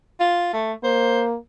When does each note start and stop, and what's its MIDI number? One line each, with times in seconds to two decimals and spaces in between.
0.20 0.48 65
0.53 0.72 57
0.84 1.36 58
0.84 1.22 72